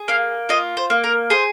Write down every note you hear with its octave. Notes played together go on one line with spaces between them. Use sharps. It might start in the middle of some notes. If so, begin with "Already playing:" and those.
Already playing: G#4
A#3 F5
F4 D#5
C5
A#3
A#4
G#4 C5